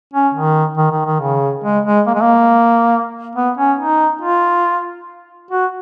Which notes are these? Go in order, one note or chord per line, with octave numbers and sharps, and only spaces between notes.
C#4
D#3
D#3
D#3
D#3
C#3
G#3
G#3
A#3
G#3
A#3
B3
C#4
D#4
F4
F#4